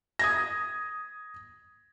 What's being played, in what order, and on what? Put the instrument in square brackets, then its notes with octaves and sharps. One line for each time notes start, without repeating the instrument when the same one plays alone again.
[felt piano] D#6 G#6 A#6